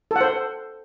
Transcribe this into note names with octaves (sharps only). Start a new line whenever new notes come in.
A4 C5 F#5